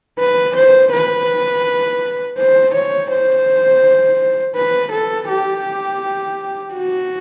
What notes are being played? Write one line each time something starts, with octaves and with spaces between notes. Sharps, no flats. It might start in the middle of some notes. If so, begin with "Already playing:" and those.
B4
C5
B4
C5
C#5
C5
B4
A4
G4
F#4